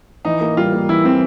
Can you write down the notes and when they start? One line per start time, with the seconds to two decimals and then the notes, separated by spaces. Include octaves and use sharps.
0.25 E3 D#4
0.41 A#3
0.57 G3 F4
0.73 A#3
0.89 E3 E4
1.05 E3 C4